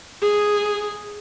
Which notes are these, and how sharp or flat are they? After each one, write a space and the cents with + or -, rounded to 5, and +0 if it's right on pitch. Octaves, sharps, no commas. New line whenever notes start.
G#4 -5